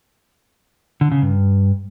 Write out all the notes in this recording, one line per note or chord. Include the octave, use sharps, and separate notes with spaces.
D3
C#3
G2